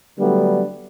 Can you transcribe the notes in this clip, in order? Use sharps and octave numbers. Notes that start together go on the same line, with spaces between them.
D3 F#3 G3 A3 B3 D4